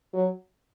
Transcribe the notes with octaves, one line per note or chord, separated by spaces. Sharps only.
F#3